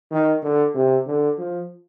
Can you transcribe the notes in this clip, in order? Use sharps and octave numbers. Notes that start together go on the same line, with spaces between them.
D#3
D3
C3
D3
F3